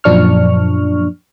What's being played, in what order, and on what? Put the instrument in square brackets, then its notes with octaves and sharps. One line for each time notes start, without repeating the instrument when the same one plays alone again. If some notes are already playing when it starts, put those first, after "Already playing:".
[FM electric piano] F#2 A#2 F3 D4 C#6 F6